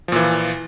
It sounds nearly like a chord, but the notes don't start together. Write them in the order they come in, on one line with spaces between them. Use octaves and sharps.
F3 A#2 E3